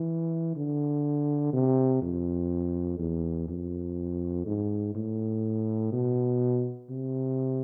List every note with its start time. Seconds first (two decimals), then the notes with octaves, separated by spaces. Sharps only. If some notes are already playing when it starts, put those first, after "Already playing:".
Already playing: E3
0.56 D3
1.53 C3
2.02 F2
2.99 E2
3.48 F2
4.46 G#2
4.95 A2
5.92 B2
6.90 C3